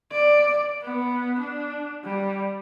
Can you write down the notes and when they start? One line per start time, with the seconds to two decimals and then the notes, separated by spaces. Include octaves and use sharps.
0.11 D5
0.82 B3
1.39 D4
2.04 G3